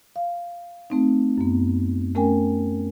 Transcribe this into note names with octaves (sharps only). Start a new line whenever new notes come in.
F5
A3 C4 D#4
F#2 B3
A3 C#4 A#4 G5 G#5